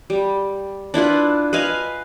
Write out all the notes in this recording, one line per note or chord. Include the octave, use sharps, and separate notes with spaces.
G3
D4 E4 F4 B4
B4 D#5 F5 G#5